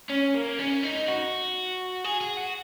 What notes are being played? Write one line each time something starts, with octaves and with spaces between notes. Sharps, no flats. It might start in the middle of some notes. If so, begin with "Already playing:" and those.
C#4
A#3
C#4
D#4
F#4
G#4
G#4
F#4